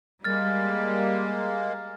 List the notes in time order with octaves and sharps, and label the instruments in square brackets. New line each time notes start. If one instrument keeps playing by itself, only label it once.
[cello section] G3 [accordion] G#3 A#3 [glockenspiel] F6 A6